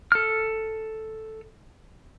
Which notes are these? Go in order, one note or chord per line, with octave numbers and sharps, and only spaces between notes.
A4 F6